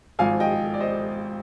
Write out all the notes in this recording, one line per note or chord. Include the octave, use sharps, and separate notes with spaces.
G#1 G#2 F3 F5 G#5
D#5 G5
D5
C5 D#5